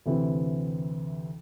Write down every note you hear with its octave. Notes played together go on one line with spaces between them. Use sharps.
D2 C3 E3 C4 E4